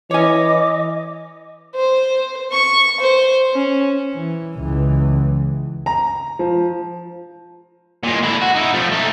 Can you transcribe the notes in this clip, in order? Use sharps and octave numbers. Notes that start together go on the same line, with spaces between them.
E3 C#5 D#5 G#5 D6
C5
C#6
C5
C#4
E3
C#2 E3
A#5
F3
A#2 G#3
D3 E4
F#4
D#4 E4
F3 A3
A3 D#4